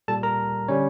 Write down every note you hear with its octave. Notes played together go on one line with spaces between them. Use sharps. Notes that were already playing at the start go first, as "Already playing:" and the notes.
A#2 G3 A4 A5
A#4 A#5
D3 G3 C#4 C#5